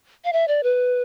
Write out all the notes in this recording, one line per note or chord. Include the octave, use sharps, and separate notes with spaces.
F5
E5
D5
B4